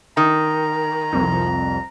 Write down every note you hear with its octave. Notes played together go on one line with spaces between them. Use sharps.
D#3 A#5
C2 F2